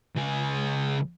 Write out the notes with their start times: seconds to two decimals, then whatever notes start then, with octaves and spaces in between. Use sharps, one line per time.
0.16 C#2 G#4